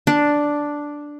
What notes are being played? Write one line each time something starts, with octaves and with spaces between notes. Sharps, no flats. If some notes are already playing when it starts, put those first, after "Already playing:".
D4